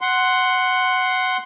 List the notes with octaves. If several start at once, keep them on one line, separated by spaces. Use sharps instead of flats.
F#5 C6